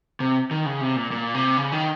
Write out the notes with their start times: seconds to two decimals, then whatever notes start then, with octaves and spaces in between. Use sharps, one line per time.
0.20 C3
0.51 D#3
0.66 C#3
0.81 C3
0.96 A#2
1.12 A#2
1.34 C3
1.57 C#3
1.72 D#3